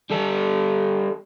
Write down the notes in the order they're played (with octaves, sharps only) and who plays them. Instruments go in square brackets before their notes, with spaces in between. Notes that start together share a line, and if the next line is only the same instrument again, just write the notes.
[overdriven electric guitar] G3 A4